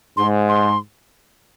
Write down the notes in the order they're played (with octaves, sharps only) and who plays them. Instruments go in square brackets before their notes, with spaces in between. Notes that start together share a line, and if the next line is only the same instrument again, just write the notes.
[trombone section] G#2 [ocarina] C6
[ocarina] C6